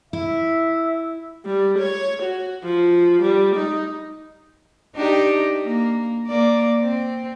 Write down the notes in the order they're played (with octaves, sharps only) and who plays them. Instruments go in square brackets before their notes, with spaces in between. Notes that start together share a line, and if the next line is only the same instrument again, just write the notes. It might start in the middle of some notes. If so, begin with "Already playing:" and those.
[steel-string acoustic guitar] E4 [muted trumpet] E5
[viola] G3
C#5
F#4
F3
G3
D#4
[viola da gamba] D4 D#4 G4
A#3
A#3 D5
C4